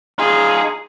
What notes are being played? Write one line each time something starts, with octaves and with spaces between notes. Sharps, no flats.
D#4 F4 G#4